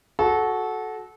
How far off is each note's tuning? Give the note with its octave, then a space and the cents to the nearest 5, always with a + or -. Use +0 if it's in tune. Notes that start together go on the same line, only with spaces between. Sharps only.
F#4 +0 A4 -25